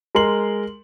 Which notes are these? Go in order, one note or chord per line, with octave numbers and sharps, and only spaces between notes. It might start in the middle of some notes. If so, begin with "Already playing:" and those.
G#3 A#4 C6 F#7